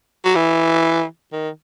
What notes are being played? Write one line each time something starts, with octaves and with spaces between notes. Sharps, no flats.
F#3
E3
D#3